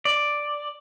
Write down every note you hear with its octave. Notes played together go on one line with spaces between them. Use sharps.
D5